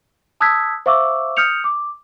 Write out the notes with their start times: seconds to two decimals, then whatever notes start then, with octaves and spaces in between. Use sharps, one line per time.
0.40 A5 D#6 E6 F#6 G#6 B6
0.86 C5 E5 F5 C#6 D6 E6
1.37 D#6 F6 G6 C#7 F7
1.64 D6